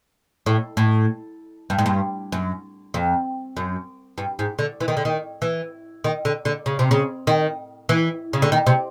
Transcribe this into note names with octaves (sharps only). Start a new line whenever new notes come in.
A2
A2
G2
G#2
G2
F#2
F2
F#2
G2
G#2
D3
E3
D#3
D3
D#3
E3
D#3
D3
D3
C#3
C3
C#3
D#3
E3
C#3
D3
D#3
C3